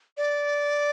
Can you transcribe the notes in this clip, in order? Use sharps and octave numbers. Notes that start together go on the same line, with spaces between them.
D5